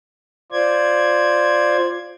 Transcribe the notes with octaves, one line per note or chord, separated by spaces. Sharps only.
F4 C5 D5 G#6